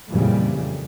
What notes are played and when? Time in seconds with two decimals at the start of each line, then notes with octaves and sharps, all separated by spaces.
0.10 F2 A#2 C#3 E3 G3